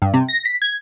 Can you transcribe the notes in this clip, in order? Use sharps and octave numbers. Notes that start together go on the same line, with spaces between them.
G2
C3
A#6
B6
G#6